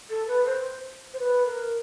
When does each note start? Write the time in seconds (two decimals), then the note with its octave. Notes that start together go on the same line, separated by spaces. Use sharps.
0.10 A4
0.28 B4
0.46 C5
1.14 C5
1.19 B4
1.46 A#4